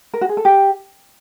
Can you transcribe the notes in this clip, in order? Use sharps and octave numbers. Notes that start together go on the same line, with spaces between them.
A#4
F#4
G#4
A4
G4